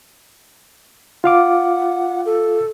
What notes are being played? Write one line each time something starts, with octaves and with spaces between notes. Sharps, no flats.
F4 F5 F#5 D6
A4